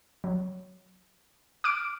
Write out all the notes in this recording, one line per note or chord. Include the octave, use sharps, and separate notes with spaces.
F#3
D6 F6 D7